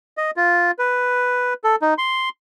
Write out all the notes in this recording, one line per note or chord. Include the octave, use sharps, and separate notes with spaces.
D#5
F4
B4
A4
D#4
C6